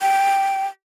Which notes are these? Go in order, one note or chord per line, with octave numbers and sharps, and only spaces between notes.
G5